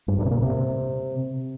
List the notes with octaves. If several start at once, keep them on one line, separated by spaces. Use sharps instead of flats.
G2
G2
C3
A#2
C3